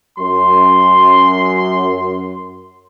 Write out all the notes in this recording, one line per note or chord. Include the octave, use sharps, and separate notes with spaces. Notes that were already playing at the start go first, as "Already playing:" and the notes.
F#2 C6